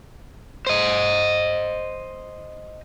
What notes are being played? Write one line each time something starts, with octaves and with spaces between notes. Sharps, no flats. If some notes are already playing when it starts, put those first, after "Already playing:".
C5 D#5